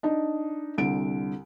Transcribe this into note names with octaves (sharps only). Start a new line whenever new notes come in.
D4 D#4
C2 D3 D7